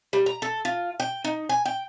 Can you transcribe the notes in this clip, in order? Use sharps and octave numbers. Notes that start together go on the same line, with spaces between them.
G3
A#5
A4
F4
G5
D#4
G#5
G5